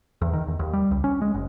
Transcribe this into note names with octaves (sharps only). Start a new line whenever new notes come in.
E2
D#3
E2
D#2
G3
C#2
C#4
G#3
F#1